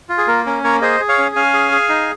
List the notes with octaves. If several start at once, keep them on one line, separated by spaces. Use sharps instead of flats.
F4
G#4
A#3 A#4
C#4 A#4
A#3 A#4 C#5
G#4 C5 D#5
G#4
C#5 F5
C#4
C#4 F5 G#5
G#4
G#4
D#4